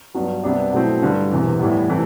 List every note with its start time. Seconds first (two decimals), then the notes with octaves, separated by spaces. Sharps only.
0.14 G2 F#3 B3 D4
0.44 C2 C3 G3 B3 D4
0.73 B2 F#3 A3 C4 E4
1.02 G2 D3 G3
1.31 E1 E2 C3 E3
1.59 A2 E3 G3 B3
1.89 C3 E3 A3